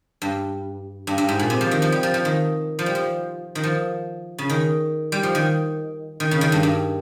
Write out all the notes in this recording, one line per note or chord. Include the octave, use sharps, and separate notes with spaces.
G2
G2
G2
G#2
A#2
C3
F3
D#3
F3
G3
F3
F3
D#3
F3
G3
F3
D#3
F3
C#3
D#3
G3
F3
D#3
D#3
C#3
D#3
G2
G2